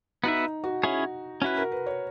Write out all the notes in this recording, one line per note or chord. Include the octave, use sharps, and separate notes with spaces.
B3 D#4 F#4 B4 E5
F#4
C#4 E4 G#4 C#5
C#4 E4 F#4 B4
A#4
B4
C#5